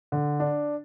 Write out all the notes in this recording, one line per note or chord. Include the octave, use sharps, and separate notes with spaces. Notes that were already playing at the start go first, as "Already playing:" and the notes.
D3
D4